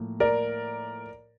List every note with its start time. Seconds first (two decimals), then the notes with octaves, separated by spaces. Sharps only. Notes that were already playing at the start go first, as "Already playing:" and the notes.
Already playing: A2 F3 A#3
0.20 A#4 D5